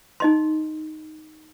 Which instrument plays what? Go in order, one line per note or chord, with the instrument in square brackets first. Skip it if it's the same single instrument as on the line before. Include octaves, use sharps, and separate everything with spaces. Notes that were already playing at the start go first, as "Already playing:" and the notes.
[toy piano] D#4 D#5 C6